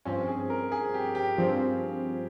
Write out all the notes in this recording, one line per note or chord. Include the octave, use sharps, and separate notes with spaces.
G2 F3 C4 C#4
G#4
A#4
G#4
G4
G4
G2 F3 C4